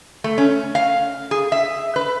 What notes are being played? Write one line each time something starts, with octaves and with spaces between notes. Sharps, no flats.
A3
C#4
F5
G#4
E5
B4